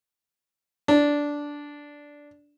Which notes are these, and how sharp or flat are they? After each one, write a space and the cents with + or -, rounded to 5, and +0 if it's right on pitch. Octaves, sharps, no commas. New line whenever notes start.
D4 -10